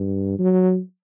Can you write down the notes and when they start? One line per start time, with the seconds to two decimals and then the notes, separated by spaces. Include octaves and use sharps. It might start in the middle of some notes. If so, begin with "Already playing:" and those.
Already playing: G2
0.39 F#3